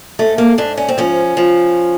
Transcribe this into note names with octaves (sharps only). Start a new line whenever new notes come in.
G#2 A3
A#3
G#2 D4
C#4
C4
F3 C#4
F3